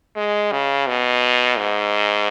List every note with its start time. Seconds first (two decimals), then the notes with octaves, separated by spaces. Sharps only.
0.16 G#3
0.52 C#3
0.87 B2
1.58 G#2